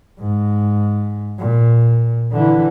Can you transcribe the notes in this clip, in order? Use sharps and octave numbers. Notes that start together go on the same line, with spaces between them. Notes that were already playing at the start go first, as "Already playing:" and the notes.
G#2
A#2
D3 E3